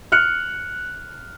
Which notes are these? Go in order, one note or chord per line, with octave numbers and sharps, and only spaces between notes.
F6 F#6 C#7